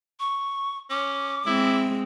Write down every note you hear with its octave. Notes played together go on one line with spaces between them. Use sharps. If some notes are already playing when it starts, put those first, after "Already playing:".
C#6
C#4 D6
G#3 C4 E4